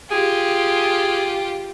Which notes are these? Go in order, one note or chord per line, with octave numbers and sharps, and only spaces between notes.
F4 G4 G#4